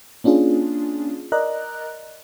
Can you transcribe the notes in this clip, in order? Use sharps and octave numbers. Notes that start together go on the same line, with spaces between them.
A#3 C#4 D4 F4 G#4
A#4 D5 D#5 A#5 F#6